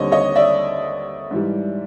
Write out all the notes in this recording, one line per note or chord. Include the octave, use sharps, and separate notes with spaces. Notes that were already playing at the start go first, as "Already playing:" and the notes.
Already playing: D#2 D3 G3 C4 C#5 D#5
C#5 D#5
D5 E5
G#2 E3 G3